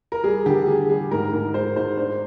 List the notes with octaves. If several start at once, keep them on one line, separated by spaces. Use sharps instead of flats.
A#4
G3 G#4
D3 G4
D3 G#4
G3 G#4
G#2 A#4
G#2 A#4
G#3 C5
G#2 C5
D4 C5